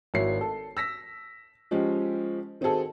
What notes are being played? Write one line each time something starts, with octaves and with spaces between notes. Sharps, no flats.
G#1 E4 F#4 C#5 C7
A4
E6 A#6 B6
F3 G#3 C#4 G4
D#3 C4 D#4 F#4 G#4 A4